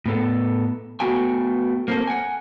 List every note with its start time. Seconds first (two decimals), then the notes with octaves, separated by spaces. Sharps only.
0.06 A2 B3 A4
1.00 A3 B3 F#4 G5 G#5
1.88 A#3 C4 A4
2.07 F#5 G#5